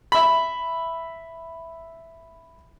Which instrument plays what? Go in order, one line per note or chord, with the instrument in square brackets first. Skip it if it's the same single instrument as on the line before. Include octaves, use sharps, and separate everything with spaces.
[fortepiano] E5 B5